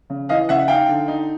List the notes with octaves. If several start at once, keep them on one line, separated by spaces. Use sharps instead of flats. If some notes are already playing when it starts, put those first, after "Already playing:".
C#3
E3 D#5 F5
C#3 E5 F#5
D#4 F5 G5
D3
D#4